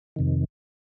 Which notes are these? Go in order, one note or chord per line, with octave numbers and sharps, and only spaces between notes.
F2 C3 D#3